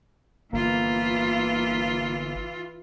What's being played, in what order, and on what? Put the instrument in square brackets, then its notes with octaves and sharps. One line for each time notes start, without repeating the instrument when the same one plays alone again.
[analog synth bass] G1 [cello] E3 F4 [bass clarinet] A#3